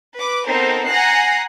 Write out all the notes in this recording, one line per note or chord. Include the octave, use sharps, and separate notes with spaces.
B4 D6
B3 C4 D#4 A4 A#4 C5
F#5 G#5 A#5 F#6 A#6 C7